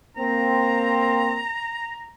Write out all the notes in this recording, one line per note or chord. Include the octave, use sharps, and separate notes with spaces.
A#3 C4 A#5